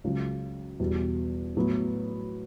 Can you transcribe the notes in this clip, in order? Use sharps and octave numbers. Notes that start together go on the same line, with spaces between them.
C#2 C#3 F#3
E2 B2 G3
A2 F#3 B3